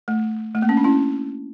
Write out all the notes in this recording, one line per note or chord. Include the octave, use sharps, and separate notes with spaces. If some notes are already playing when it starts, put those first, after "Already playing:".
A3
A3
A#3
C#4
D4
C#4 E4